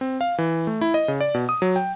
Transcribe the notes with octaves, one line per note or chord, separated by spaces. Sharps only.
C4
F5
E3
A3
E4
D#5
C#3
D5
B2
D#6
F#3
G5